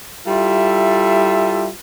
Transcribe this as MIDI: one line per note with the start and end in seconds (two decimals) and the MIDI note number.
0.27 1.69 55
0.27 1.69 64
0.27 1.69 65
0.27 1.69 69
0.27 1.69 76